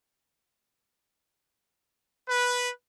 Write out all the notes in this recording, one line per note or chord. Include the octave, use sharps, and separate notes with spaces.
B4